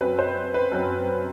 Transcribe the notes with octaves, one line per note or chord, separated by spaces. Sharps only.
F#2 F#3 C4 B4
C5
B4
F#2 F#3 C4